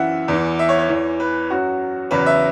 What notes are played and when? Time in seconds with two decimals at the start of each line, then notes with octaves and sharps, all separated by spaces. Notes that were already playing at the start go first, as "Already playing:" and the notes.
Already playing: F#2 E3 E5 F#5
0.28 E2 E3
0.59 E5
0.69 C#5
0.79 C#5
0.89 E2 E3
1.20 B4
1.50 F#2 F#3 F#4
2.11 E2 C#3 F#3 B4
2.26 E5